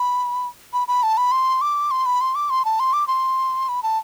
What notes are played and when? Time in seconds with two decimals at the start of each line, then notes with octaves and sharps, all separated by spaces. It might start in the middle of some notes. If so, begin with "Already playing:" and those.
Already playing: B5
0.73 B5
0.88 B5
1.03 A5
1.17 B5
1.32 C6
1.61 D6
1.91 C6
2.06 B5
2.21 C6
2.35 D6
2.50 C6
2.65 A5
2.80 C6
2.93 D6
3.08 C6
3.69 B5
3.83 A5